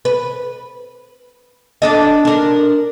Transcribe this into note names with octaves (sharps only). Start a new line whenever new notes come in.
B4
D4 A4 D#5
D4 A#4